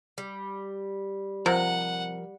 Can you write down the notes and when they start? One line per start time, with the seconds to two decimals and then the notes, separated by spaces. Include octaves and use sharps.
0.18 G3
1.46 C3 F3 A#4 F#5